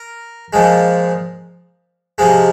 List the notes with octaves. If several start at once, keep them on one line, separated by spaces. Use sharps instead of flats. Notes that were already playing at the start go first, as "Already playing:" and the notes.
Already playing: A#4
A#2 F3 G#3
C3 F3 G#3